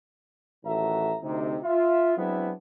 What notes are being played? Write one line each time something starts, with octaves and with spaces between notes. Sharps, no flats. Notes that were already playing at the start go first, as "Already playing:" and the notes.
A1 D#3 F#4 A4 E5 A#5
D2 C3 D#4
F4 E5
F#3 G#3 B3 C4 D4 E4